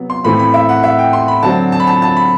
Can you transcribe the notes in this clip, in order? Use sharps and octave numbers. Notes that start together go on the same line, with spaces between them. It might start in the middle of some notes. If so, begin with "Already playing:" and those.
Already playing: C3 F#3 B3
C6
A2 E3 A3 C4 B5
B5
E5
F#5
E5
G5
C6
B5
D3 F#3 C4 A5
A5
B5
A5
A5
B5